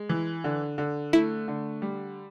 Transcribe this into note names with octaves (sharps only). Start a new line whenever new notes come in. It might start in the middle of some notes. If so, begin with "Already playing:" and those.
Already playing: G#3
E3
D3
D3
A3 E4
D3
G3